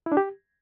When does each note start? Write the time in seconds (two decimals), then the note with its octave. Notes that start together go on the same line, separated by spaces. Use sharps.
0.06 E4
0.12 D4
0.17 G4